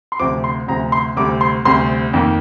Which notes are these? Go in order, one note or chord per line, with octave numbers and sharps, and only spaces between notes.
C6
D2 C3 F3 D6
C6
D2 C3 F3 A#5
C6
D2 C3 G3 C4 D6
C6
D2 C3 G3 C4 C6
F2 D#3 A#3